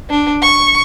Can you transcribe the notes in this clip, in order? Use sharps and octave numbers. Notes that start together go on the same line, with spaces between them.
D4
C#6